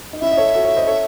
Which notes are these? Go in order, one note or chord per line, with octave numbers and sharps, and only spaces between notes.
D#4
C#4 E4 E5
D#5
A4 C#5
F#4 A4
A4 C#5
C5 D#5
A4 C#5